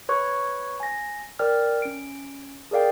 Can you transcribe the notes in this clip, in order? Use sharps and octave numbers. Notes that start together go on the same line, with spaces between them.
B4 C#5 C#6
G#5 A#6
A#4 D5 G5 F6
C#4 D7
G#4 A#4 D5 F5 G5